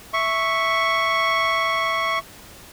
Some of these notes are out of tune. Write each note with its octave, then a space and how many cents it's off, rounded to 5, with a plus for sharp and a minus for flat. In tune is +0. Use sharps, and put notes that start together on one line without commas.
E5 +0 C#6 +0